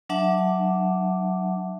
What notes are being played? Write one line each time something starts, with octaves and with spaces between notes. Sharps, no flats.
F#3 D4 E5 F#5 A5 D6